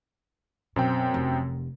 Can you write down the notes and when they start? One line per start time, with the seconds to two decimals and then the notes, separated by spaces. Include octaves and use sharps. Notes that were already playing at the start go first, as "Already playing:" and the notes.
0.76 F#2 B2 C4 G5
1.14 F1